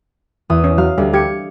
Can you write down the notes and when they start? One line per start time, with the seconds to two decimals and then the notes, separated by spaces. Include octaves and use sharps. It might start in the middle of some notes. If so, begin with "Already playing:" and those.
0.50 E2 E3 D#6
0.64 C#4
0.78 F#3 F5
0.98 D2 G3
1.14 G4 G#6 C#7